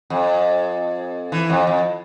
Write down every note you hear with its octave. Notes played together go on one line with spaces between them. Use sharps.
F2
E3
F2
F2